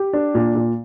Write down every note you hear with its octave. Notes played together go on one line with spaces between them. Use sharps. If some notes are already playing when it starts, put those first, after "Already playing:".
Already playing: G4
D4
A#2
A#2